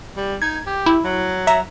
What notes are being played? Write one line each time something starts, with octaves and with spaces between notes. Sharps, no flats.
G3
D#4 G#6
G4
E4
F#3
E5 A#5